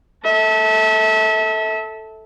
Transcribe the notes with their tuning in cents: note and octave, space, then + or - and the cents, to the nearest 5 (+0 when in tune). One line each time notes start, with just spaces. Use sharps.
A4 +0 E5 -30